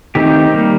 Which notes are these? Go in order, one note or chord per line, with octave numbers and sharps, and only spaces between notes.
D#3 A3 C4 D#4 G4
D#3 G3 A#3